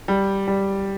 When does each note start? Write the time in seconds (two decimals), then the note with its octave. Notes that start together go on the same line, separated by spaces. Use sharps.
0.08 G3
0.48 G3